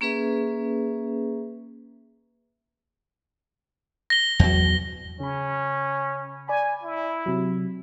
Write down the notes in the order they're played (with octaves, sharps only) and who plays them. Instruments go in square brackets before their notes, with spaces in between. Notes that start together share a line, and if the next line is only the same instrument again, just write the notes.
[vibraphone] A#3 C#4 G#4 B4 E5
[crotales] A#6 G7
[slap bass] E2 F#3
[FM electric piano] C#3 B5 [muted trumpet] C#4
[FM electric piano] D5 B5 [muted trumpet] G#5
[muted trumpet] E4
[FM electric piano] C3 F#3